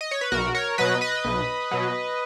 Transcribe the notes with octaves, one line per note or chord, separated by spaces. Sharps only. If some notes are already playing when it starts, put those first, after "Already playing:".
D#5
C#5
B4
B1 F#4 A#4
A#4 C#5
B2 F#3 B4 D#5
B4 D#5
B1
B2 F#3